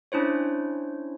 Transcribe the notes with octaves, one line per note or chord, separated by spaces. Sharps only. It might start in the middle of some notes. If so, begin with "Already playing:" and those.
C#4 D4 E4 C5 C#5